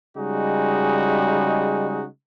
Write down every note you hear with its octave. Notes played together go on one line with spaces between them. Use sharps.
C#3 G3 G#3 D#4 F#4